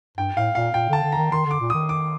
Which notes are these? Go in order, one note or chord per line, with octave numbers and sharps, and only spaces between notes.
G2 G5
A2 F5
A#2 F5
A#2 G5
D3 A5
D3
D#3 A#5
D#3 C6
D3 D6
A#2
D#3 D#6
D6